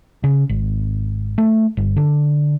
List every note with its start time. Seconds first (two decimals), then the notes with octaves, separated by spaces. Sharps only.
0.24 C#3
0.49 G#1
1.38 A3
1.77 G1
1.97 D3